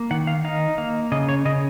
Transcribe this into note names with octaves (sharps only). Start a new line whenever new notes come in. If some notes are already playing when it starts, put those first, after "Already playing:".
Already playing: A#3
D#3 F#5
F5
D#4 F5
A#3 F5
C#3 D#5
C#5
C#3 D#5